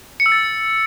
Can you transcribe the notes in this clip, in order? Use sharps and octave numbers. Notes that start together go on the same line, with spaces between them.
C#7
E6
A6